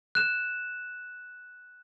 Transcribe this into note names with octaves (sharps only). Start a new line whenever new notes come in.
F#6 E7